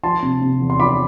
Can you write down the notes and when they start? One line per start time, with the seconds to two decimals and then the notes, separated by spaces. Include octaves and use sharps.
0.03 F3 A5 C6
0.22 C3
0.41 C3
0.61 E2
0.70 C6
0.80 F3 B5 D6